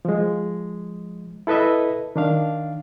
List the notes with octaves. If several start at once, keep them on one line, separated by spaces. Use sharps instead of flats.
F3 G#3
E4 A4 B4 D#5 E5
D#3 D4 F5